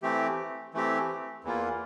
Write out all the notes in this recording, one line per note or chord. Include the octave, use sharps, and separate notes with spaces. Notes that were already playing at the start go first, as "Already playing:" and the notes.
E3 A3 C4 G4
E3 A3 C4 G4
E2 E3 A#3 F4